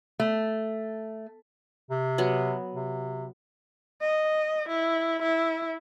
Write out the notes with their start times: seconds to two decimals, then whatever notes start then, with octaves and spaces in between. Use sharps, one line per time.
0.20 A3
1.91 C3
2.18 F#3 B3
2.74 C3
4.01 D#5
4.69 E4
5.22 E4